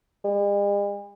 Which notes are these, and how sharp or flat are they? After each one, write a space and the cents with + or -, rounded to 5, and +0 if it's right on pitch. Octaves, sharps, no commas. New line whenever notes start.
G#3 -45